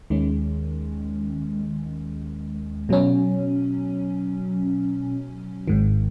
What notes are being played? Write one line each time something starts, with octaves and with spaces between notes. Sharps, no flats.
D#2 D#3 G#3 C#4
B2 F#3 C#4
G#1 G#2 D#3